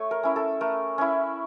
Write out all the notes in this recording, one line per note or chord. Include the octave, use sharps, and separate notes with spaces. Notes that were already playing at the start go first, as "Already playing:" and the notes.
Already playing: A3 C#5
A#4
C#4 E4
A4
A3 A#4
C#4 E4